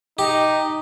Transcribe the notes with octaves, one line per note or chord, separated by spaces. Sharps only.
D#4 G4